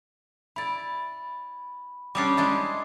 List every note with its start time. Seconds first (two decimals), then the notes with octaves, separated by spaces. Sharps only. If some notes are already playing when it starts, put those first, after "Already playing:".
0.56 E4 D5 B5
2.15 G3 C#4 D4 D6 D#6 C7
2.37 G#3 D4 E4